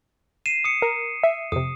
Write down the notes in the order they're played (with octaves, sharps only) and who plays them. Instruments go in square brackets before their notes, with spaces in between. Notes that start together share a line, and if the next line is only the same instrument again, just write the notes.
[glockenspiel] C7 D#7 E7
D#6 C#7
[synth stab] A#4
E5
[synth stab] F2 C3 [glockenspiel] D#6